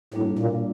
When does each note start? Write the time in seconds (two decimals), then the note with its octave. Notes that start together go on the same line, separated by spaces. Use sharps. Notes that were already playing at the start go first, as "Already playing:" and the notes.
0.14 A2 G3 A#3 D4 F#4
0.39 A#2